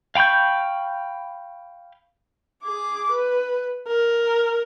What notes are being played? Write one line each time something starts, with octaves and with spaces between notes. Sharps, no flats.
F5 G5 B5 C#6 G6
G#4 D6
B4
A#4